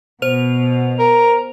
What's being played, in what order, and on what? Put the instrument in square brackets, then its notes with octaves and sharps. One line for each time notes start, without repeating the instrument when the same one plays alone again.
[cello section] B2 [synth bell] C5 F7
[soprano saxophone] A#4